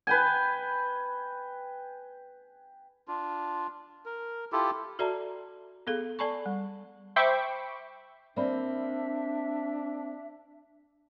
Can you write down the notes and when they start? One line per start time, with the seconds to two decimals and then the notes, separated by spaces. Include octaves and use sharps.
0.07 B4 G5 G#5
3.08 D4 F4
4.05 A#4
4.52 E4 F4 G4 A4
4.99 F#4 A4 D5 E5 A5 A#5
5.87 B3 G#4 A4 F5
6.19 A4 D5 G#5 A5 B5 C#6
6.46 G3
7.16 C5 E5 G5 B5 C#6 D6
8.37 A#3 C4 D4 C5 D5 E5 B5